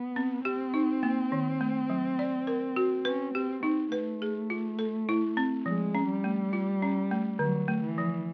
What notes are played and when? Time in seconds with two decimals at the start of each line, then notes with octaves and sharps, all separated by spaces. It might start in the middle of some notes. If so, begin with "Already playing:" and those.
Already playing: B3
0.16 C4
0.45 C4 G4
0.74 D#4
1.03 A#3
1.32 D#3
1.61 A3
1.90 F#3
2.19 D5
2.47 A#4
2.76 F#4
3.05 C#4 B4
3.34 C4 G4
3.63 C4 D#4
3.92 A3 B4
4.22 G#4
4.50 F4
4.79 A4
5.09 E4
5.37 C4
5.66 F3 G#3
5.95 C#4
6.09 G3
6.24 A3
6.53 F4
6.82 C#4
7.11 A3
7.39 D3 F#3
7.68 A3
7.84 E3
7.98 F3